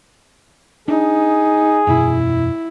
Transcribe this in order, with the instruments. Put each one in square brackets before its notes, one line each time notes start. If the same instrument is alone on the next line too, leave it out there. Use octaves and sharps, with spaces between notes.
[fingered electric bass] D4 [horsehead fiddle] D#4 [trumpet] G#4
[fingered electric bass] E1 F#2 B2 [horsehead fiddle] E4